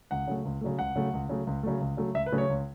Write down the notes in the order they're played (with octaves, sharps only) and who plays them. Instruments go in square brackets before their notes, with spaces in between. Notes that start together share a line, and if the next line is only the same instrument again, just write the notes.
[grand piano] C#2 F#5
C#3 F#3 A3
C#2
C#3 F#3 A3
C#2 F#5
C#3 F#3 A3
C#2
C#3 F#3 A3
C#2
C#3 F#3 A3
C#2
C#3 F#3 A3
C#2 E5
B4
C#3 F#3 A3
C#5
C#2